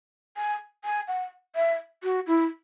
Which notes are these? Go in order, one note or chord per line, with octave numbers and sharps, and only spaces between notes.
G#5
G#5
F#5
E5
F#4
E4